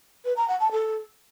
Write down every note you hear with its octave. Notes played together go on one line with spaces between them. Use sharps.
B4
A#5
F#5
A5
A4